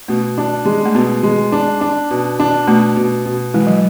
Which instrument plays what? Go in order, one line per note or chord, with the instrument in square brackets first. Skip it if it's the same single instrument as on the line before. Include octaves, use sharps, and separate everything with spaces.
[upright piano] B2 [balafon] A3
[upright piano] D4
G#3
[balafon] A3
[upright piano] B2 [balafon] B3
[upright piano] G#3
D4
D4
B2
D4
[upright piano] B2 [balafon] A3
[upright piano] B2
B2
[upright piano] E3 [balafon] G#3
[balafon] F#3